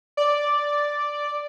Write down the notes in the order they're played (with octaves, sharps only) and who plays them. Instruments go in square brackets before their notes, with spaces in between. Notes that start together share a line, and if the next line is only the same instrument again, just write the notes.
[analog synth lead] D5